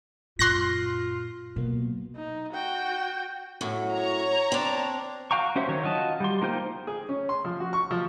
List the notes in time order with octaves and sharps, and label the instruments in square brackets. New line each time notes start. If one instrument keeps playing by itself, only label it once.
[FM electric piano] F#2 [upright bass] A#2 [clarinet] F4 [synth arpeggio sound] C6 F#6 A#6
[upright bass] B2 [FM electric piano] F#3 A#3
[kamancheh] D#4
F#4 G5
[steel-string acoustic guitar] F#2 A2 F#3
[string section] C#5 A#5
[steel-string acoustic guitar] C4 D4
[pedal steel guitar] F#4 F5 G5 A#5 C#6
C#4 F#4 C5 E5
D#3 F#3 C#5
F4 F#4 D#5 A5
G3 C6
A#3 D#4 F4 C5 G5
[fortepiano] G#4
C#4
C6
F3
F#4
C#6
F3